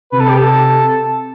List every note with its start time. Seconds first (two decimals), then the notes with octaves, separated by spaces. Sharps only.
0.12 C3 B4
0.20 A4
0.29 G4
0.38 A4